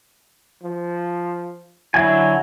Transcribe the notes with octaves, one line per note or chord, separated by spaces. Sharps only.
F3
D3 F#3 E4 G#5